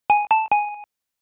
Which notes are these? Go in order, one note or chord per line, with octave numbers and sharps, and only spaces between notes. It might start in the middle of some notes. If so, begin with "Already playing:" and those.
G#5
A5
G#5